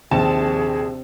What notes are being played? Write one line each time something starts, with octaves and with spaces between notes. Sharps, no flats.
A#1 D#2 C3 G#4 A5